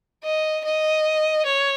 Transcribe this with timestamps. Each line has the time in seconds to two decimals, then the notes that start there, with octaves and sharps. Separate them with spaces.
0.24 D#5
0.65 D#5
1.46 C#5